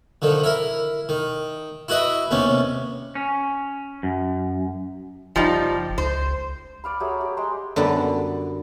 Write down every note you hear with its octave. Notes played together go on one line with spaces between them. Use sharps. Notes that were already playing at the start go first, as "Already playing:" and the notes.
D3 D#3 F3
E4 A#4
D#3
E4 F#4 B4 D#5 E5
D#2 C3 B3 C#4
C#4
F#2
F#1 F3 G3 D#4
C#2 C5
D5 F5 B5
F#3 A3 G4 G#4
G4
G#3 G5 A#5 C6
F#2 D3 G3 B3